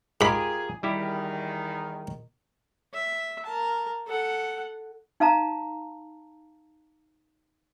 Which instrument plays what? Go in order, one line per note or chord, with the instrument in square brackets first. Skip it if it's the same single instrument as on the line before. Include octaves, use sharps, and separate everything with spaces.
[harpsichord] G#2 B5 [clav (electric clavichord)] F4 G4 A#4 [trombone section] G#4
[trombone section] E2 D#3 [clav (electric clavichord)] G3 E4 G4
[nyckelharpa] E5
A#4 A5
A4 F#5
[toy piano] D#4 F5 A5 A#5